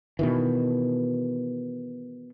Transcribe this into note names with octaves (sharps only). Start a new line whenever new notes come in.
B2 D#3 E3